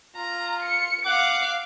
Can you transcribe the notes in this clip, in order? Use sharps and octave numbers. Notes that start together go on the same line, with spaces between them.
F4 A#5
C#7
F5 F#5 D6